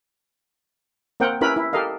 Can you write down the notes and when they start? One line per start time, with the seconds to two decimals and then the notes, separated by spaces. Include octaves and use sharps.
1.20 A#3 C4 A#4 F#5 G5
1.41 C#4 E4 G4 A#4 B4 B5
1.56 E4
1.73 G4 A4 A#4 D#5 F5